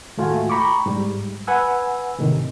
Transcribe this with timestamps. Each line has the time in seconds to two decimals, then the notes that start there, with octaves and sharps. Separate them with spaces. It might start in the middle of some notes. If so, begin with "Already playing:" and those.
0.17 D#2 A2 A3 F4 F#4 G#5
0.50 G5 A#5 B5 C#6 D6
0.86 G#2 G3
1.47 B4 F#5 G#5 E6
2.18 A2 C3 D#3